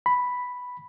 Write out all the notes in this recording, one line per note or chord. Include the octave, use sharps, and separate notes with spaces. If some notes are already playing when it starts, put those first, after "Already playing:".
B5